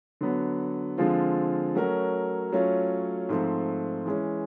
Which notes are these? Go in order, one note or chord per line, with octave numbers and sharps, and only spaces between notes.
D3 F#3 B3
D3 F3 G#3 C4 F4
F#3 A3 C#4 F#4 A#4
F#3 A3 C#4 F4
G#2 F3 A3 C4
E3 G#3 C#4